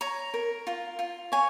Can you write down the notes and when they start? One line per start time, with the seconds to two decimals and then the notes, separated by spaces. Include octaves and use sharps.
0.01 C#5 A#5
0.34 A#4
0.67 F4
0.99 F4
1.32 C#5 G#5